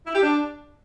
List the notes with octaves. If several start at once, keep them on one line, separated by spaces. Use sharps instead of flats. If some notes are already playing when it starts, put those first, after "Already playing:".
E4
G4
D4